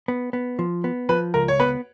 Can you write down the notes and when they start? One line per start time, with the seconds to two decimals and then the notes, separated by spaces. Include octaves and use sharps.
0.08 B3
0.33 B3
0.59 F3
0.84 B3
1.09 F3 B4
1.34 C#2 A#4
1.48 C#5
1.60 B3 B4